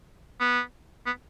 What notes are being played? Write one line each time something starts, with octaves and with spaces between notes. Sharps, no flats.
B3
B3